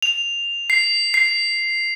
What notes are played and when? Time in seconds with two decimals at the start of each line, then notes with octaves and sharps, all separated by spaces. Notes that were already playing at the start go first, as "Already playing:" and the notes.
0.02 F7
0.70 C7
1.14 C7